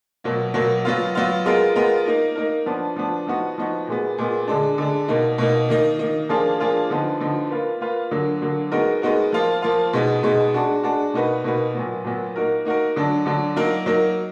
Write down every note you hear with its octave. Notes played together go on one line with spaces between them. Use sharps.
B2 F#3 A#3
B2 F#3 A#3
F#3 B3 F4
F#3 B3 F4
G#3 B3 F4 A#4
G#3 B3 F4 A#4
A#3 D#4 A#4
A#3 D#4 A#4
F3 B3 D4
F3 B3 D4
F3 B3 D#4 F#4
F3 B3 D#4 F#4
A#2 G#3 B3
A#2 G#3 B3
D3 G#3 D4
D3 G#3 D4
B2 A#3 D#4
B2 A#3 D#4
D#3 A#3 D#4
D#3 A#3 D#4
F3 A#3 D4 F4 G#4
F3 A#3 D4 F4 G#4
D3 F3 B3 D#4
D3 F3 B3 D#4
A#3 F4 B4
A#3 F4 B4
D3 F#3 A#3
D3 F#3 A#3
G#3 B3 D#4 F#4 A#4
G#3 B3 D#4 F#4 A#4
F3 A#3 F4
F3 A#3 F4
B2 G#3 B3 D#4
B2 G#3 B3 D#4
G#3 D4 F#4
G#3 D4 F#4
B2 A#3 D#4 F#4 B4
B2 A#3 D#4 F#4 B4
A#2 F#3 B3
A#2 F#3 B3
A#3 D#4 F#4 A#4
A#3 D#4 F#4 A#4
D3 F#3 D4
D3 F#3 D4
F#3 A#3 D#4 A#4
F#3 A#3 D#4 A#4